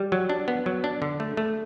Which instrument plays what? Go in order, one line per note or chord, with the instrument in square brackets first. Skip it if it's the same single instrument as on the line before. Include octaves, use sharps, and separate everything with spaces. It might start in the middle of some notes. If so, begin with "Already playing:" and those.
Already playing: [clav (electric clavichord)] G3
F#3
D4
B3
F#3
D4
D3
A3
A3